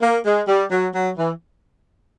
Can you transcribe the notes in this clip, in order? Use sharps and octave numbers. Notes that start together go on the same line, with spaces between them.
A#3
G#3
G3
F#3
F#3
E3